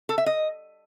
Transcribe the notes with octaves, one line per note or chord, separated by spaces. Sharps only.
A4
E5
D#5